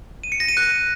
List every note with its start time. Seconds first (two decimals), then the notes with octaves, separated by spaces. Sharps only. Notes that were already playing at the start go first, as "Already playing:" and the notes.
0.24 D#7
0.32 C#7
0.40 A#6
0.49 D#7
0.57 F#6